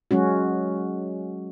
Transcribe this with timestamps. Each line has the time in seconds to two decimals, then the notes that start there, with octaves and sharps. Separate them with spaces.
0.11 F#3 G#3 C#4 F#4